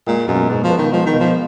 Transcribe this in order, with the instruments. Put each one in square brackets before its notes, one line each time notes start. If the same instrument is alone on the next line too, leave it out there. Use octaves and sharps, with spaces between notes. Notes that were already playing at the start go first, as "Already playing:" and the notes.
[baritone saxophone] A#2 [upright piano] G#3
[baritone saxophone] F#2 [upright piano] B2
[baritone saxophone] G#2 [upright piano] B2
[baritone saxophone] F3
[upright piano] B3
[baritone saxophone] D#3
[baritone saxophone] F3 [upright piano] G#3
[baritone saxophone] D#3
[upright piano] B2
[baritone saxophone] F3